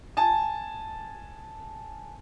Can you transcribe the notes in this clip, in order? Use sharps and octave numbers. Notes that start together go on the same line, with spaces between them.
G#5 A5